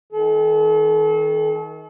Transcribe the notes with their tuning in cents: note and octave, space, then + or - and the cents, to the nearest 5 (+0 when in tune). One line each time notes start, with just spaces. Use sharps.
D#3 +30 A4 -40